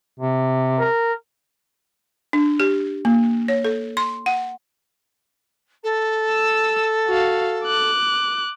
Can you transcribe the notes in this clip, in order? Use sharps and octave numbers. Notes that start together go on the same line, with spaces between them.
C3
A#4
D4
G4
A#3
C#5
A4
C6
F#5
A4
E6
F#4 F5
D6 F#6